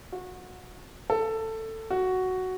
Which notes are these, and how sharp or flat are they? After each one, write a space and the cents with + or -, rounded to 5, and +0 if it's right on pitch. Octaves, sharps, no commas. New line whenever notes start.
F#4 -25
A4 +15
F#4 +5